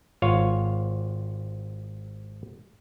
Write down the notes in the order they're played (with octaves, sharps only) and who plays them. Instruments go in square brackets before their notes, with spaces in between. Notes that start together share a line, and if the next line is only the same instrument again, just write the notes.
[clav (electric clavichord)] G#1 F4 C#5 F5